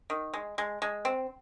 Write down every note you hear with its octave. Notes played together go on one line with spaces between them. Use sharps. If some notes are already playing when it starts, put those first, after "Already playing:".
D#3
G#3
G#3
G#3
C4